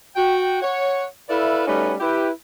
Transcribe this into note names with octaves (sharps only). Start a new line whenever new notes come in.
F#4 G5
C#5 F#5
E4 A4 B4 D5 E5 F5
G3 A3 C#4 D#4 F#4 B4
E4 G4 B4